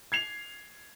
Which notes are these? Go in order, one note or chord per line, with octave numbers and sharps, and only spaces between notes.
G#6 C7 F7